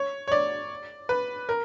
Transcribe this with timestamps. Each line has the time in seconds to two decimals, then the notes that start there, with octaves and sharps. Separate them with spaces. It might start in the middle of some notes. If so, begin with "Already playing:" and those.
Already playing: C#5
0.28 C#5
0.32 D5
1.09 B4
1.49 A#4